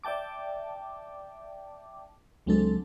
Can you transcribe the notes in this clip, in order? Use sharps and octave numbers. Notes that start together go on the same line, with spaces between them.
D5 E5 G5 A5 D6
C#2 F#3 G#3 C4 D4 A4